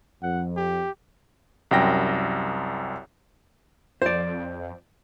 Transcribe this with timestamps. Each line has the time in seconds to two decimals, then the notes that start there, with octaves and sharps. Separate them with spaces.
0.23 F2 F#5
0.57 G4
1.71 C2 F#2 G5 A#6
4.02 F2 C5 D5